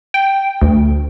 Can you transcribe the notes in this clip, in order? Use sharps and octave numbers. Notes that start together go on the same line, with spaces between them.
G5
D2